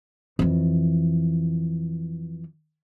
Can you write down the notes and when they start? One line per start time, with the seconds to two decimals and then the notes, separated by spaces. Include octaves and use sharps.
0.39 F2 E3